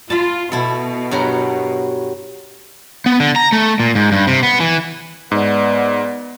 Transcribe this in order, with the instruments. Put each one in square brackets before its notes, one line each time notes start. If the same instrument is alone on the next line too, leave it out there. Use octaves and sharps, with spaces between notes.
[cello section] F4 [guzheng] A5 B5
[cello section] B2 [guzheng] E4 A4
[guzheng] G2 F#3 A#4
[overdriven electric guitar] B3
D3
A#5
A3
A#2
G#2
G2
C3
B3
E3
[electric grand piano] G#2 [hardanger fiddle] B3 D5